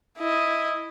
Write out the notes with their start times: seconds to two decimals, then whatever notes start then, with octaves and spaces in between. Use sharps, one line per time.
0.18 E4 D#5